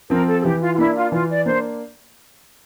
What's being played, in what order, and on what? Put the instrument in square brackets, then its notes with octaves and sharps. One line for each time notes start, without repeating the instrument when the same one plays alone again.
[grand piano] F3 C4 [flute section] A#4
[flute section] A4
A4
[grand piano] E3 [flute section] G4
[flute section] F4
F4
[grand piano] A#3 D4 [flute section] E4
[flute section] F4
[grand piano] E3 [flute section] F4
[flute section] D5
[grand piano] A#3 D4 [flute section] C5